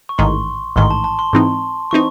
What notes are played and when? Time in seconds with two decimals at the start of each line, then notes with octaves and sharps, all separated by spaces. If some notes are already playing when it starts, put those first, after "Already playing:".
0.09 C#6
0.18 A1 G#2 D#3 C6
0.76 A1 G#2 D#3 C6
0.90 A5
1.04 A5
1.19 C6
1.33 G#2 E3 C4 D#4
1.91 E3 C4 D#4 C#6